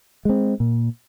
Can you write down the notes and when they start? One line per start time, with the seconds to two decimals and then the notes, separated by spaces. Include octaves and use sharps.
0.25 G#3 C4
0.60 A#2